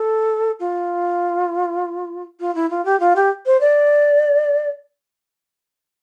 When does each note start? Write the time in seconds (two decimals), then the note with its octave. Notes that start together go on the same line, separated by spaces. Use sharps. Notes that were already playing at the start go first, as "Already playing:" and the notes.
Already playing: A4
0.60 F4
2.40 F4
2.55 E4
2.70 F4
2.85 G4
3.00 F4
3.16 G4
3.46 C5
3.61 D5